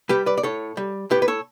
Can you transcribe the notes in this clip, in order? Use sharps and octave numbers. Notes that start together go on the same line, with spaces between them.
G3 G4 B4
B4 D5
D5
A2 A4 C#5
G3
A2 G4 B4
B4
A4 C#5